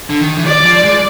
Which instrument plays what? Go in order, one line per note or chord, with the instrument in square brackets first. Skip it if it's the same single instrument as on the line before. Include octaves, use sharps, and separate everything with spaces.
[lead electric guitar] D3
D#3
E3
[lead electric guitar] D#3 [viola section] D5
[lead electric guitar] F3
G#3